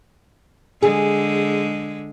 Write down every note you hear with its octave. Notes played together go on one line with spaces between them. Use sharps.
D3 G#3 G#4